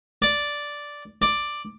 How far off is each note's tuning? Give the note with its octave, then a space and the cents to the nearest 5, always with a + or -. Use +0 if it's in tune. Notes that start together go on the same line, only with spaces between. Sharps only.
D5 -5
D5 +5